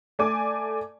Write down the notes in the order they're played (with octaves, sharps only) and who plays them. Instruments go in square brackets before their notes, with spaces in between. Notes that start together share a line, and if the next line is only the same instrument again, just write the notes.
[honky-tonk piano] A3 D5 G#5 D6